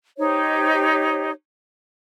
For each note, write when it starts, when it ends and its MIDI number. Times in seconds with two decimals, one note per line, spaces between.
0.18 1.31 63
0.18 1.31 67
0.18 1.31 72
0.18 1.31 73